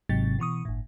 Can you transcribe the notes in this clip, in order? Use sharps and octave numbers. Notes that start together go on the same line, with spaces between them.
G#1 G#2 C3 F#3 A6
B2 E3 C#6 D#6
G1 A2